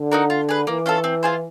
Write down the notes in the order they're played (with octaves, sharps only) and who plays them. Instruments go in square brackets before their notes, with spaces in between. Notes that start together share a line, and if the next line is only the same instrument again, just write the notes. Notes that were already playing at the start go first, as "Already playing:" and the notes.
Already playing: [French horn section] D3
[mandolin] D#4 F#4 A#4
F4
G#4 B4
[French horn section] E3 [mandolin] A#3
[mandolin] C#4 F4 A4
C4
F4 G#4 C5